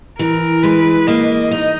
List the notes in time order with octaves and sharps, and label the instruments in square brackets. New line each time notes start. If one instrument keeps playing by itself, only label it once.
[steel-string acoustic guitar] E3 [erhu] A#4
[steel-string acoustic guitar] G#3 [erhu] B4
[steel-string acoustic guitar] A#3 [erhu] D#5
[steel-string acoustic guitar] D#4